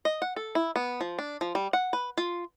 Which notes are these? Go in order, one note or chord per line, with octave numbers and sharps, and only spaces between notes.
D#5
F#5
A4
E4
B3
F3
D4
F3
G3
F#5
B4
F4